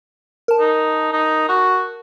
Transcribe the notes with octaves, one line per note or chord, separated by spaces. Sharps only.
A#4 A5
D#4
D#4
F#4